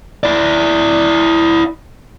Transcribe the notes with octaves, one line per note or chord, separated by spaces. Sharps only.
E4 D5